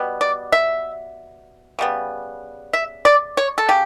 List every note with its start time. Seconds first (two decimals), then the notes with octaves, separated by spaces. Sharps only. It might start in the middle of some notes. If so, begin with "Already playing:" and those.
Already playing: B2 G3 B3
0.21 D5
0.52 E5
1.79 C#3 G3 B3
2.73 E5
3.05 D5
3.37 C#5
3.58 A4
3.68 C#3 G4